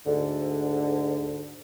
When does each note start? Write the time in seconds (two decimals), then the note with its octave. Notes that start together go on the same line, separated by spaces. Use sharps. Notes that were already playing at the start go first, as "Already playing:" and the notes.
0.06 D2 G#2 D3